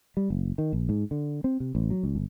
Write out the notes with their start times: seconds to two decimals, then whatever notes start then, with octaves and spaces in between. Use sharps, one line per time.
0.17 G3
0.30 F#1
0.58 D#3
0.73 A#1
0.89 G#2
1.11 D3
1.44 C4
1.60 C3
1.75 A1
1.90 F#3
2.03 C#2
2.15 G1